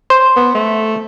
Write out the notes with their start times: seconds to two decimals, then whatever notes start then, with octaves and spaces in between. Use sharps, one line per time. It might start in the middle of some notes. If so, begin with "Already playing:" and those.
0.10 C5
0.36 B3
0.55 A3